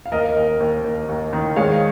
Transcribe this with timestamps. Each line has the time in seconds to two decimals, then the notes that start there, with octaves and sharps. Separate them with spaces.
0.06 F5
0.12 D#2 A#4 D#5
0.36 D#2
0.60 D#2
0.84 D#2
1.09 D#2
1.33 D#3
1.56 G#3 C#5 F5